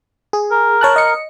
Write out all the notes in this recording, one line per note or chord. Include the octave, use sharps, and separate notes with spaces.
G#4
A#4
C#5 A5 F#6
D#5 C#7